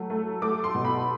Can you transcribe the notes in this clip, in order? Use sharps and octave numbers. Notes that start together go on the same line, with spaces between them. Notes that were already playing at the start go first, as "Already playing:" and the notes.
Already playing: F#3 A3
A3
A3 D6
C6
B2
B5